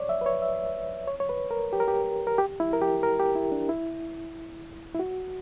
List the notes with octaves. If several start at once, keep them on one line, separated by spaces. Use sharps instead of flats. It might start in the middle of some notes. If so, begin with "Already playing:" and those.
Already playing: C#5 D5
E5
B4
C#5
E5
C#5
C#5
B4
A#4
G4
A#4
G4
A#4
G4
E4
A#4
G4
A#4
G4
E4
D4
E4
E4
F#4